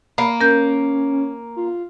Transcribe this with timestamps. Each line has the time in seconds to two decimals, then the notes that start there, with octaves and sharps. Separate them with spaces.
0.18 A#3 B5
0.41 C#4 A#4 G6
1.56 F4